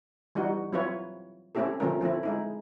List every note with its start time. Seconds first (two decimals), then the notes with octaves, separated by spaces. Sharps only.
0.35 E3 G3 D4 D#4 F#4
0.73 F#3 C4 E4 F4 B4 C#5
1.55 A3 C4 C#4 E4 G4 A4
1.80 D3 F3 A3 C4 C#4 A#4
2.01 F3 A3 C4 E4
2.23 G#3 D#4 E4